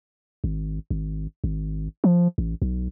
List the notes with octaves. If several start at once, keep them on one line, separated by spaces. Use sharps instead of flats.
G#1
G#1
G#1
F3
A1
B1